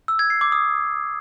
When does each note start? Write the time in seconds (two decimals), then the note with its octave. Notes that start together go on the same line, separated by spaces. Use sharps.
0.08 E6
0.19 G#6
0.30 C7
0.41 D6
0.52 D#6